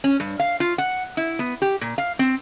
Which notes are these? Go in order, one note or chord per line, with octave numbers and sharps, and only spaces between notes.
C#4
G2
F5
F4
F#5
E4
B3
G4
A#2
F5
C4